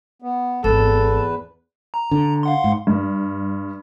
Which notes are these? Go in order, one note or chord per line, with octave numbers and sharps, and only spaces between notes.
B3
G#1 E2 B3 A4 B4
A#5
D3
F5 F#5 C6
G#2
G2